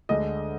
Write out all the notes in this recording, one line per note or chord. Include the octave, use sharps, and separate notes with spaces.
D2 D3 G#3 D#5